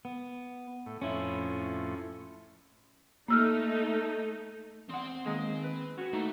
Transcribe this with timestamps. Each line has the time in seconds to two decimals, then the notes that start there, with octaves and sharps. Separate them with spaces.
0.05 B3
0.86 A2
1.02 F2 A2 C#4 E4
3.28 A3 A#3 D#4 E6 F6
4.89 E2 C4 F#5 C6
5.26 D#3 G#3 A#3 G#4
5.64 B4
5.98 C#4 F#4 B4
6.13 A3 A#3 D#4 E4